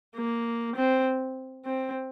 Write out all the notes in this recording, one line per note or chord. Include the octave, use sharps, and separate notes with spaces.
A#3
C4
C4